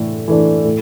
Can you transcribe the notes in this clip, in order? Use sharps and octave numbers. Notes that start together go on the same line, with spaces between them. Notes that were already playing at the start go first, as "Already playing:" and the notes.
Already playing: A2 E3 A3 D4
E3 A3 D4
A2